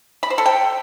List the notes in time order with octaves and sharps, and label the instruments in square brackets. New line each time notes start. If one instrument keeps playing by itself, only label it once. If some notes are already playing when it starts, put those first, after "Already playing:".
[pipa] B5
C5
A4
G5